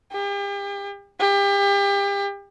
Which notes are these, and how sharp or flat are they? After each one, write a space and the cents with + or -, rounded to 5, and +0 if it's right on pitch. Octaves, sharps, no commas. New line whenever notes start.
G4 +40
G4 +35